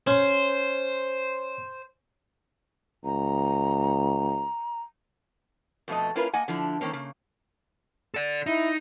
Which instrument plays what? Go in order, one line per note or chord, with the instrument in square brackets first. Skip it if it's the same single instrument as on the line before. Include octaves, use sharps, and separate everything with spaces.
[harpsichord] C#4 C6 [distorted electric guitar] C5
[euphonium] C#2 [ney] A#5
[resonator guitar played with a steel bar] F2 B2 A3 A4 D#5
A#3 C#4 E4 F4 A#4 B4
A#3 D#5 F#5 G#5
D3 F3 D4 E4
D#3 A#3 C4 C#4
C#3 A#3
[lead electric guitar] A4 D5
[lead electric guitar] D#4 [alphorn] E4